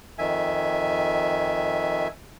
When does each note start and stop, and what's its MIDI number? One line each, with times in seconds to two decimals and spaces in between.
0.19 2.08 41
0.19 2.08 51
0.19 2.08 76
0.19 2.08 80